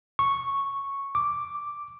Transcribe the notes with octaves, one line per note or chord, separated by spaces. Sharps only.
C#6
D6